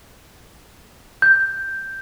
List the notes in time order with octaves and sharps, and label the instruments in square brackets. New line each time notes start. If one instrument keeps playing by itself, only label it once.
[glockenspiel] G6